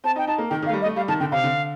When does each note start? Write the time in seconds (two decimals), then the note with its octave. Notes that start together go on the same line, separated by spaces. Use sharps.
0.04 C4 A5
0.16 D#4 G5
0.27 D#4 A5
0.38 A#3
0.50 D#3 G5
0.63 D#3 F5
0.69 A3
0.73 G3
0.82 D#5
0.85 A3
0.96 G3 F5
1.08 D#3 A5
1.20 D3 G5
1.31 C3 F5
1.44 D3